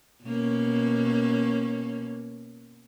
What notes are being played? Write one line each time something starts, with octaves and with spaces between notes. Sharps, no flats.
B2 A#3 C#4